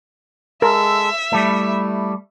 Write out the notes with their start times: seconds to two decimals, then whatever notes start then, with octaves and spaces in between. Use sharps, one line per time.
0.62 G#3 A4 A#4 E5 E6
1.32 G3 A3 E4